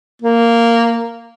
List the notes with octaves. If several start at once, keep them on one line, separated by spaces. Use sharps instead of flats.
A#3